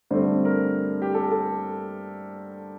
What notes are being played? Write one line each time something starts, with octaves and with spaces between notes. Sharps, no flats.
G2 D3 A3 C4 C5
A#4
G4
A4
A4